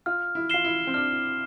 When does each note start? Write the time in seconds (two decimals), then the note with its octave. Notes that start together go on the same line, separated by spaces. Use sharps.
0.06 F4 F6
0.35 E4
0.50 F4 C7 E7 G7
0.64 E4
0.87 C4
0.94 D4 F6